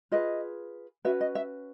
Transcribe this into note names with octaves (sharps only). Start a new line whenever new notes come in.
F4 G#4 B4 D#5
C#4 F#4 B4 E5
D#5
E5